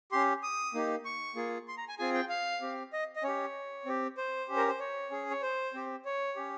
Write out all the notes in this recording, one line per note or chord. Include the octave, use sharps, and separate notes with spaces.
C#4 G4 C6
D#6
A#3 D#4 G4
C#6
A#3 F4 G#4
C6
A#5
G#5
C4 F4 G#4 G#5
G5
F5
C4 G4
D#5
D#5
C#4 G4 C#5
C4 G4
C5
C#4 G4
A#4
C5
C#5
C#4 G#4
C#5
C5
C4 G4
C#5
C#4 G4